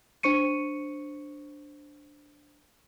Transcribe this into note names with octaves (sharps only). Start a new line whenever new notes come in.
D4 C5 C#6 C#7 D#7